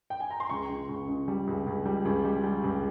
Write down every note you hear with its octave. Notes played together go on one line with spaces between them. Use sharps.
G5
G#5
A#5
C6
C#2 C#6
C#3
C#2
C#3
G3
C#2
C#2
G3
C#2
G3
G3
C#2